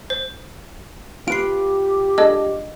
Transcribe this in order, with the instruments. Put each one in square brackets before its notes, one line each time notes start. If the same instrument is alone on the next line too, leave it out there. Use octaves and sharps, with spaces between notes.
[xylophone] C5
[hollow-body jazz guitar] F4 B4 [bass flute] G4 [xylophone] C7 D7
[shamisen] G#3 D4 A4 [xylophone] D#5